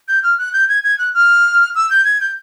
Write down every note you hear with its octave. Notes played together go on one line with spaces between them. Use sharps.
G6
F6
F#6
G6
G#6
G#6
F#6
F6
E6
G6
G#6
G6